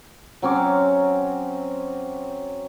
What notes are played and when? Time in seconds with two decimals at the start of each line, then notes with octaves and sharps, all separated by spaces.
0.42 F#3 C4 C#4 D6